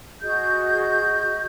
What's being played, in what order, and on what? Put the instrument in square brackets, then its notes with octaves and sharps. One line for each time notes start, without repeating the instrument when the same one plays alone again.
[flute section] F#4 G#4 D#5 G6